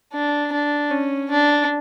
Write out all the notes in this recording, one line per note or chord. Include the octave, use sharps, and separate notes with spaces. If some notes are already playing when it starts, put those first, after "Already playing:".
D4
D4
C#4
D4